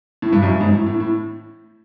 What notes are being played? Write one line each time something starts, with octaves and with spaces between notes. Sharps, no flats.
A2
G2
F#2
G2
G#2
A2
A2
A2